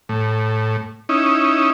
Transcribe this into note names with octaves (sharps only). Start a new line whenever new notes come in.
A2
C#4 D#4 E4